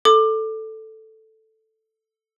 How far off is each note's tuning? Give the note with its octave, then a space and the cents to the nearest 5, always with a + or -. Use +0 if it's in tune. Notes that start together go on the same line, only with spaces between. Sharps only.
A4 +0 D6 +25